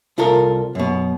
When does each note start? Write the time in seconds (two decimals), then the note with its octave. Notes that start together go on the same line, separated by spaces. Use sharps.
0.18 C2 F4 A4 A#4
0.75 F#2 B2